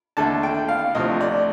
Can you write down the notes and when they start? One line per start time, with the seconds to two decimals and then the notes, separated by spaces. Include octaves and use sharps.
0.17 D#2 D3 A3 A5
0.43 G5
0.69 F5
0.95 D2 C3 F3 D#5
1.21 D5